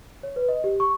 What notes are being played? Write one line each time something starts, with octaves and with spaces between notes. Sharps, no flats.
C#5
B4
D#5
G4
C#6